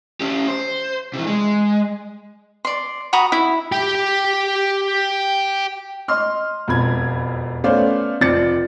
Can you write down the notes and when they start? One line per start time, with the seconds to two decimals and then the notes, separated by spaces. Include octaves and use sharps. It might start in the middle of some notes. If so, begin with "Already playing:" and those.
0.21 C#4 G4
0.48 C5
1.13 C3 E3
1.27 G#3
2.65 D5 C6
3.13 F#4 A#5 B5 D#6
3.32 E4
3.72 G4 G5
6.08 D#5 C6 F6
6.68 E1 F2 B5 G#6
7.64 A3 B3 C#4 C5 D5 F5
8.21 F1 F3 C4 D5 A6 C#7